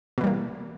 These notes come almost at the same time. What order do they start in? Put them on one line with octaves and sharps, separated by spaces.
B2 E3 G3 A#3